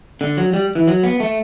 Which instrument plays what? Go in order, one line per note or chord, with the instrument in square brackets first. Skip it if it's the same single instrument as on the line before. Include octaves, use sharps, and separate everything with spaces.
[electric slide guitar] D3
F#3
G3
E3
F#3
B3
A3